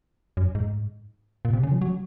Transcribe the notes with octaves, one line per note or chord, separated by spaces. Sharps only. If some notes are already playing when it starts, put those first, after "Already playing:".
F#2
G#2
A#2
C3
C#3
F3
F#3